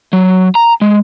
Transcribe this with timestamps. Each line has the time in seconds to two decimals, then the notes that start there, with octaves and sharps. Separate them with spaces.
0.13 F#3
0.55 A#5
0.81 G#3